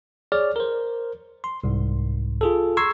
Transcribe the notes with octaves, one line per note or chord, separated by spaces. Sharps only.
G#4 C#5 D5 F6
A#4 C5
C6
C2 G#2
F4 G#4 A4
A#5 C6 C#6 E6 G#6 C7